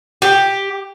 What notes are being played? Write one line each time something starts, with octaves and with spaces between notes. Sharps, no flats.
G4